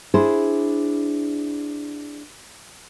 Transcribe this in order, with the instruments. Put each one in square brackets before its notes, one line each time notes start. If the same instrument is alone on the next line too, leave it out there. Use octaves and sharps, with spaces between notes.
[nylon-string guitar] D4 E4 G#4 C5